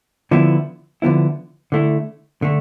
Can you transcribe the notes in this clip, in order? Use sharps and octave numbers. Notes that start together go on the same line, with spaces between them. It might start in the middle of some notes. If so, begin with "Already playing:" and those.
D3 F3 B3 E4
D3 F3 B3 E4
D3 A3 E4
D3 A3